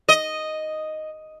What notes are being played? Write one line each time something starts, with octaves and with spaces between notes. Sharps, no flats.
D#5